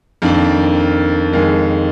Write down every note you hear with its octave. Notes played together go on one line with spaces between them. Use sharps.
F2 D#3 A#3 D4
F2 D#3 G#3